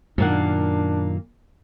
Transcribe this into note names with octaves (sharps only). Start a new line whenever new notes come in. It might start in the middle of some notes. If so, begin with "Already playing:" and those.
F#2 A#2 D#3 A#3 D4 F#5